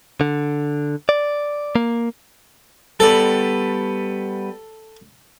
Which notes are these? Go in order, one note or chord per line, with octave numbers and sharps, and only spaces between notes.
D3
D5
A#3
G3 B3 A4 D5